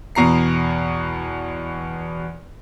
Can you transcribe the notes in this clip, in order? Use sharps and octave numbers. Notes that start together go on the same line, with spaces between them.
E2 B2 A#5 C7